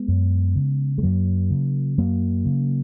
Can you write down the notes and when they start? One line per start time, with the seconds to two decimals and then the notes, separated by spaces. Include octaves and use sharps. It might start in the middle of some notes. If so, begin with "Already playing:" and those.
Already playing: G#3 B3
0.08 F#2
0.56 C#3
0.98 G#3
1.03 F#2 F#3 A#3
1.50 C#3
1.98 F#2 F#3 A#3
2.45 C#3